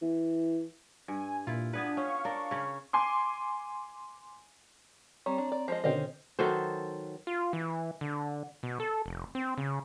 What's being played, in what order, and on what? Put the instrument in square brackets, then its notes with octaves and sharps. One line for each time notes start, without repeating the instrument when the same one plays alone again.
[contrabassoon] E3
[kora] G2 [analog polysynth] G#5
[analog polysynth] A#2 [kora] E4 F4
[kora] B3 G#4 B4 [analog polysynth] D4
[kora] C#4 [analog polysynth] F5 C#6
[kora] D4 A#4
C#3 C#4
[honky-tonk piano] G#5 C6 D6
[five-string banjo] G3 [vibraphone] C4 A#5 [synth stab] C#5
[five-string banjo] D4
D5
[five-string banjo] F3 G#3 D#5 [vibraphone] C5
[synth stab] B2 D3 D#3 [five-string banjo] C4 C#4 D#5
[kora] D#3 F#3 A4 C5
[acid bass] F4
E3
D3
B2
A4
F1
C4
C#3